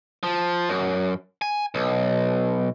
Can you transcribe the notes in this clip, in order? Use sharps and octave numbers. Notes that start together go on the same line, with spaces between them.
F3
F#2
G#5
B1